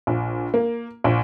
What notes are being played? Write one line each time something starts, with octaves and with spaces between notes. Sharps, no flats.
A#1
A#3
A#1